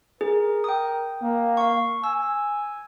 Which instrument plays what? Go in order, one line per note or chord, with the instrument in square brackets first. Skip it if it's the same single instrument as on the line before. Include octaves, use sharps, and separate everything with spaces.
[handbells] G#4 [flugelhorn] A#4
[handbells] G5 D#6
[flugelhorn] A#3
[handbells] F5 C#6
[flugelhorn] G#5 [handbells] E6